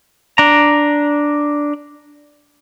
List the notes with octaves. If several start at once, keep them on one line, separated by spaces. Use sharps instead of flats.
D4 A#5